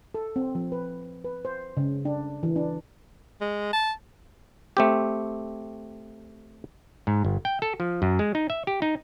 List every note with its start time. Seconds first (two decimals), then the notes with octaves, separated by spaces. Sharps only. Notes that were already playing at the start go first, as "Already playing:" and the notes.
0.15 A4
0.36 C4
0.55 F3
0.72 B4
1.24 B4
1.45 C5
1.77 C#3
2.05 D4
2.43 E3
2.56 D4
3.41 G#3
3.73 A5
4.77 A3 C4 G4
7.07 G#2
7.25 G1
7.45 G5
7.62 A4
7.80 F3
8.02 F#2
8.19 G#3
8.35 D#4
8.50 E5
8.67 G4
8.82 D#4